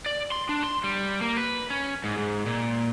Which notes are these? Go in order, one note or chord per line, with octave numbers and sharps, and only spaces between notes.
D5
C6
D4
C6
G3
A#3
B4
C#4
G#2
G#2
A#2